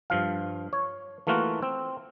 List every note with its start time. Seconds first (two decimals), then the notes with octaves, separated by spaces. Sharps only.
0.10 G2 F3 F5
0.73 C#5
1.27 E3 A3 A#3 F4 F#4
1.62 C4